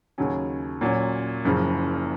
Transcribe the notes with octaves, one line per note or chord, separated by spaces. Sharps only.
D#2 C#3 F#3 C#4
A#2 F#3 C#4
F#1 F#2 C#3 F3